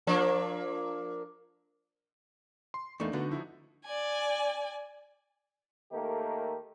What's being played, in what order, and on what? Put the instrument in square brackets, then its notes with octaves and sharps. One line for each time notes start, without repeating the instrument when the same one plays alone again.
[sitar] F3 A#3 D4
[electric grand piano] C6
[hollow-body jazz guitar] E2 A3 [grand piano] A#3 D4 [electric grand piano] D#4 C#6
[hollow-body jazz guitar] D3 [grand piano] A3 B3 F#4
[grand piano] F3 E4 F#4
[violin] D5 G#5
[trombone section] D#3 A3 A#3 D#4 G4 A4